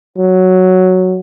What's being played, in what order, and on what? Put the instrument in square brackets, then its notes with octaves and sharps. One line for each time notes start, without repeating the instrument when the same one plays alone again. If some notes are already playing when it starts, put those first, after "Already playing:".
[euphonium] F#3